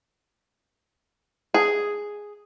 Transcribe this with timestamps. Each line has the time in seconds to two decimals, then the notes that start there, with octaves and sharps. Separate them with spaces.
1.54 G#4